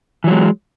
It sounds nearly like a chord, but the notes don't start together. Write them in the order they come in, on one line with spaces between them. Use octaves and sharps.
E3 F#3 G#3